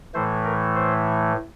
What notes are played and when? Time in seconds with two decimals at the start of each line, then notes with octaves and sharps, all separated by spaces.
0.14 A2 E3 A3 C5
0.45 A#4
0.75 C5